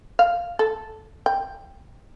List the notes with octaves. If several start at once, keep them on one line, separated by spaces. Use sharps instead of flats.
F5
A4
G5